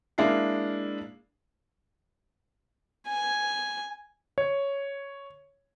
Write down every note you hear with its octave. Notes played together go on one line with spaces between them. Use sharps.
G#3 A#3 D4 E4 F5 C7
G#5
C#5